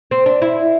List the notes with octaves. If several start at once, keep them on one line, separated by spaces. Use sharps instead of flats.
C4
D4
E4